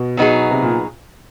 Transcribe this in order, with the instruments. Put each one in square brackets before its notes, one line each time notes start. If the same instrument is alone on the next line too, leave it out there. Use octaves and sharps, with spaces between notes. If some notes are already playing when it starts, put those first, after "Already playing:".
Already playing: [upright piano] B2
[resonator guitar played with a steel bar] F#3 B3 D#4 G#4
[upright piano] C3
A#2